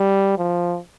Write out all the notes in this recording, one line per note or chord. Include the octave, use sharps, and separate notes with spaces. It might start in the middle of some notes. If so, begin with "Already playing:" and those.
Already playing: G3
F3